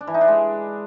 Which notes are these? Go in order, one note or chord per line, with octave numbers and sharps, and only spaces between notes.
D4
E3
D#4
D4
G#3